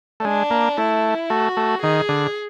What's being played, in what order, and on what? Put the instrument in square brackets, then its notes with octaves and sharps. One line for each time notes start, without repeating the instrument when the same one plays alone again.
[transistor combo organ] A3
[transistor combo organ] G#3 [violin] D4
[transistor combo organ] A#3
[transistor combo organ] A3 [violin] E4
[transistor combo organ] A3 [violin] F#4
[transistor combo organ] A3
[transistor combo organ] D#3 [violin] G#4
[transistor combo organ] D3